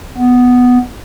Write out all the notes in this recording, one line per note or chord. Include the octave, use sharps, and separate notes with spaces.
B3